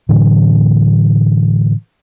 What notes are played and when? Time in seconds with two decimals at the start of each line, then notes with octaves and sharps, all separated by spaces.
0.09 A2 D3 E3 F#3